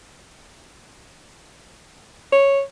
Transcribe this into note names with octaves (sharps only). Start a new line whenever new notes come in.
C#5